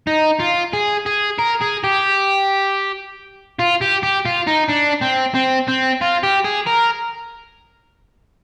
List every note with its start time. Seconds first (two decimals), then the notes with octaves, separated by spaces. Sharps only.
0.07 D#4
0.40 F4
0.73 G#4
1.06 G#4
1.39 A#4
1.62 G#4
1.84 G4
3.59 F4
3.81 G4
4.03 G4
4.25 F4
4.48 D#4
4.69 D4
5.02 C4
5.35 C4
5.68 C4
6.02 F4
6.23 G4
6.45 G#4
6.67 A#4